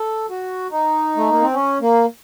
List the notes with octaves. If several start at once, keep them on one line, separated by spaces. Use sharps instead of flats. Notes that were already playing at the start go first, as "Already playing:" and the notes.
Already playing: A4
F#4
D#4
A3
A#3
C4
C#4
A#3